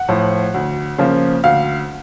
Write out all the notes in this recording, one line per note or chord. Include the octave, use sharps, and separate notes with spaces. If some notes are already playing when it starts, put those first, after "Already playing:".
Already playing: F#5
A2 F3
D2
C#3 F3 A#3
D2 F5